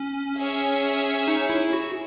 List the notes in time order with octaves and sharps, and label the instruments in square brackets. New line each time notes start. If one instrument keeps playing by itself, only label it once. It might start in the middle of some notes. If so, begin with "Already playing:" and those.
Already playing: [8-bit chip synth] C#4
[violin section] G#4 C#5 E5
[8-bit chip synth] D#4
E4
F#4